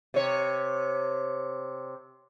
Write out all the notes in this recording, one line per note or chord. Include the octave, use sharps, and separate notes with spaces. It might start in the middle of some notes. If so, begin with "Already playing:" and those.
C3 C#5